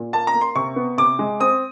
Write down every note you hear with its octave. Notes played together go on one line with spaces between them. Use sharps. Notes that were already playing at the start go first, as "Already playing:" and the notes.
Already playing: A#2
A#3 A5
A#5
A#3
C6
C3 C#6
B3
C3 D6
G#3
C4 D#6